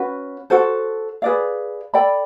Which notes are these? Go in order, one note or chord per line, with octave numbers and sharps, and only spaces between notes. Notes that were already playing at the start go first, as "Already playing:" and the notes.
Already playing: C#4 F#4 B4
F#4 A4 C5
G#4 B4 D5 F5
A4 D5 G5 B5